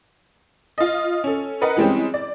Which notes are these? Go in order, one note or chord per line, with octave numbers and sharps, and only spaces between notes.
F4 D#5
C#4 A4
A#4 B4 D#5 F#5
E3 G3 G#3 C4 C#4
D5